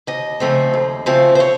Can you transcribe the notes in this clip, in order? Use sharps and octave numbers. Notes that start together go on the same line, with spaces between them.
D#2 D#5
C#3 F3 A3 C4
D#2
C#3 F3 A3 C4
C5
C#5